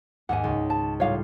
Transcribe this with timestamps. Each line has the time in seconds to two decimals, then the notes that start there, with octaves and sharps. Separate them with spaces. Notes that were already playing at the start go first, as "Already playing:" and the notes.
0.29 D#2 G#2 F#5 G#5
0.44 C#2
0.70 A5
1.00 A2 G3 F4 C#5 F5